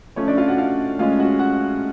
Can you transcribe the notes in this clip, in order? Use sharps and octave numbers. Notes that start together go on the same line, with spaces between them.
F3 A3 C#4 C#5
D4 D5
F4 F5
F#4 F#5
F4 F5
A2 G#3 C#4 F4 F5
F#4 F#5
F#4 F#5